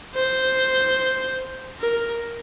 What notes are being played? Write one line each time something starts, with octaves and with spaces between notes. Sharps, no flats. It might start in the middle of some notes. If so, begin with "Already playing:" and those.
C5
A#4